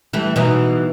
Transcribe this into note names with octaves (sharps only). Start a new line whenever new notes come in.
E3 G3 A3
B2 E3 D#4